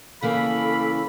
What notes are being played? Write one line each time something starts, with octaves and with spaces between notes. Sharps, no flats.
C#3 E3 A#3 A4 F5 B5